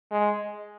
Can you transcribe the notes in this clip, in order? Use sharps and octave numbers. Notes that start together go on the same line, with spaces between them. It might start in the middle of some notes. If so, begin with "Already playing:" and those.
G#3